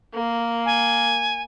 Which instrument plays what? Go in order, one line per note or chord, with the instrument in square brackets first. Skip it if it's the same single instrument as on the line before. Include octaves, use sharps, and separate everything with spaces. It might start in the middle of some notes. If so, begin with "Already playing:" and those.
[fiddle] A#3
[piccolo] G#5